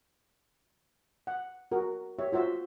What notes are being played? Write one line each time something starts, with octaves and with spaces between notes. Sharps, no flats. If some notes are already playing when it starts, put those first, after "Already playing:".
F#5
F#4 A#4
G4 C#5 E5
F4 F#4 C5 E5